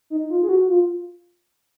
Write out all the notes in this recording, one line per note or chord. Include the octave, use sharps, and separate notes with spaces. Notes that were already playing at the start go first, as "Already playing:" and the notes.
D#4
F4
G#4
F#4
F4